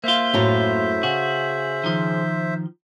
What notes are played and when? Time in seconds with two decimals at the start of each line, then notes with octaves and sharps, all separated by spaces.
0.04 A#3 F4 C5 E5
0.34 F#2 A2 A#5
1.03 C#3 F#4 G#4
1.84 D#3 F3